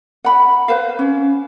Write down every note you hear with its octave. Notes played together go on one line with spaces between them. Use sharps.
F#5 B5
B4 C5 F5
C#4